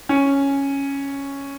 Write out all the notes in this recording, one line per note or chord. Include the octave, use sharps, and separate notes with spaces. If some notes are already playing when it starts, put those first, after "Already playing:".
C#4